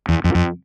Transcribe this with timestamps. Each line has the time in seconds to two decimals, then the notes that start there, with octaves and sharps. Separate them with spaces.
0.09 E2
0.24 F2
0.35 F2